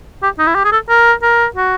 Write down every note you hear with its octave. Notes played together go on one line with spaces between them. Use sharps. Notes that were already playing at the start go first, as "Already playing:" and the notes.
G4
D#4
E4
G4
G#4
A4
A#4
A#4
F#4